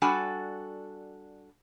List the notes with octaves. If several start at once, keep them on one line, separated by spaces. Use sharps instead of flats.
G3 D4 F#4 A4 G#5